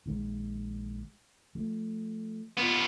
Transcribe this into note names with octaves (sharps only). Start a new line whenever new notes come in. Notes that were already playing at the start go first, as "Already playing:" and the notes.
A#1 D#3 G#3
F3 A3
B3 F4